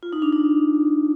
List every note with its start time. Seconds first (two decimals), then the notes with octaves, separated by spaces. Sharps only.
0.03 F4
0.13 D#4
0.22 D4
0.33 D#4